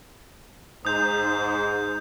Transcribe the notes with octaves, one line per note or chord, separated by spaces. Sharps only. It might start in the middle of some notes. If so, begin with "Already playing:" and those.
G#2 D#4 G#4 C5 D#6 G6